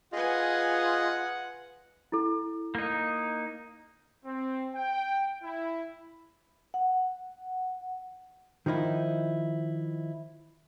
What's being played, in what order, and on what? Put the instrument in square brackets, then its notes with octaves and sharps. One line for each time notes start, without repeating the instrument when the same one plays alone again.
[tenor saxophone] F4 [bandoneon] G#4 D#5 [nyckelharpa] B4 G#5 [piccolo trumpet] F#5
[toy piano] E4 A4
[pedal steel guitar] A#3 D#4
[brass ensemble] C4
G5
E4
[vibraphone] F#5
[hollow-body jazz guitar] D#3 F3 D#4 E4